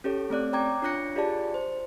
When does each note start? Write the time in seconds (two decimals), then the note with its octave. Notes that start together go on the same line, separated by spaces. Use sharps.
0.04 C#4 G4 A4 C#5
0.30 A3 C4 D5 F#6
0.53 C#5 G5 A#5 D6 G#6
0.82 D4 F4 C#5 F#6 A#6 C#7
1.15 F4 G4 G#4 D5 A5
1.54 C5